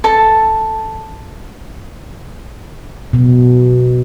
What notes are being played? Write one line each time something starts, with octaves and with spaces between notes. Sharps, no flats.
A4 A5
B2